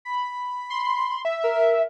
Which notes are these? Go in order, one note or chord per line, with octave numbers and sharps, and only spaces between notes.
B5
C6
E5
A#4